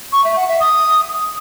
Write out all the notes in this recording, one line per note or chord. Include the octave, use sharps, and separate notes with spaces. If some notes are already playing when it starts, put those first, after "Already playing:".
C#6
E5
F#5
E5
D#6